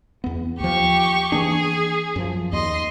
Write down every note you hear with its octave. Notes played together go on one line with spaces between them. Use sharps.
E2 B3
D#2 F3 G4 C#6
E3 A#3 D4 G#4
F#2 F3
D#2 D#5 C6